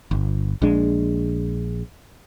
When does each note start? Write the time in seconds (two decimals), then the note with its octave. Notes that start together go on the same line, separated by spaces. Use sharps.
0.11 G1
0.62 A#1 G#3 D4